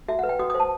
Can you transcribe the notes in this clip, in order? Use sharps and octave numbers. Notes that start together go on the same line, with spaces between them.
F#4 E5
B4 F#5
G5
F#4 D#6
C5 D#6
A5